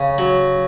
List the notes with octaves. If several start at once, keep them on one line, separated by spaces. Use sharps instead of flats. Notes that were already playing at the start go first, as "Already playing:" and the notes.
Already playing: C#3
F#3